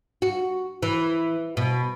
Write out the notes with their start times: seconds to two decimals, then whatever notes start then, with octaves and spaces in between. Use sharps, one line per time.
0.22 F#4
0.83 E3
1.57 B2